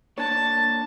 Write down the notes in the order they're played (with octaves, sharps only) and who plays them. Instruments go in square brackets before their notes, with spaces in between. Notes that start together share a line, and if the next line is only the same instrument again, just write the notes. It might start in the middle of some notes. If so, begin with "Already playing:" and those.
[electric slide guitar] A#3 D4 C#5 [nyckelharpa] A5